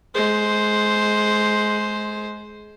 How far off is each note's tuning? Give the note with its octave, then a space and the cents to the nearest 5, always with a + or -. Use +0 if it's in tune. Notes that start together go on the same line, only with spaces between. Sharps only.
G#3 +25 C5 +0